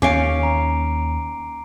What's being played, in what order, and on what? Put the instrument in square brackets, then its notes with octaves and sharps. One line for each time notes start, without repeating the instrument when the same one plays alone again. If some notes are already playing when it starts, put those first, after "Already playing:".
[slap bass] D#2 [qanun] C#4 F5 [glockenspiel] D6 C7 D7
[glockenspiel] A#5